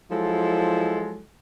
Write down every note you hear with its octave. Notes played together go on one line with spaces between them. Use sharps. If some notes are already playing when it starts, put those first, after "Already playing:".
F3 F#3 G#3 E4 A4